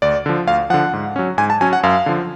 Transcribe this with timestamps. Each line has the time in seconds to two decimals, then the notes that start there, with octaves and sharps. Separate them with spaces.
0.02 D2 D5
0.26 D3 F3
0.47 D2 F5
0.70 D3 F3 F#5
0.93 G#2
1.16 F#3 C#4
1.38 G#2 G#5
1.50 A5
1.61 F#3 C#4 G#5
1.73 F#5
1.83 F#2 F5
2.06 D3 F3